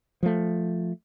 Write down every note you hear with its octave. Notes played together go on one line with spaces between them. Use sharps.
F3 A3